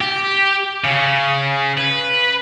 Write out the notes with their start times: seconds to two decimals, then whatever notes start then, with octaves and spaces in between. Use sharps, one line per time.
0.01 G4
0.84 C#3
1.78 B4